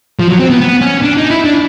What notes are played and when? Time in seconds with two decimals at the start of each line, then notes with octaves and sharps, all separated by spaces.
0.19 F3
0.29 F#3
0.39 C4
0.50 B3
0.61 B3
0.81 C#4
1.02 D4
1.18 D#4
1.31 E4
1.45 D4